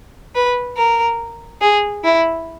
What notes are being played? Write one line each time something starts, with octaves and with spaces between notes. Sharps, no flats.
B4
A#4
G#4
E4